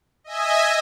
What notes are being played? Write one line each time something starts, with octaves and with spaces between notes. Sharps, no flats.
D#5 E5 G#5